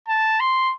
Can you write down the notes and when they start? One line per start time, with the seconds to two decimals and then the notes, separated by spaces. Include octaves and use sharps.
0.08 A5
0.40 C6